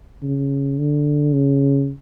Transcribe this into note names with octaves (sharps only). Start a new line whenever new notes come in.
C#3
D3
C#3